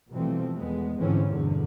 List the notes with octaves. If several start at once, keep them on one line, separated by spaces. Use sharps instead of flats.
B2 E3 F3 G3 A3 C4
E2 G#3 B3
G#2 D3 E3 F3 C4 C#4
E2 G2 B2 D3